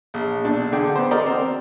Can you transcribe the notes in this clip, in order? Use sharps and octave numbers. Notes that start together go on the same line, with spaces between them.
A#1
B1 D4
D3 G#4 G5 D6
B3 C5
F#4 A#4 D5 D#5
C4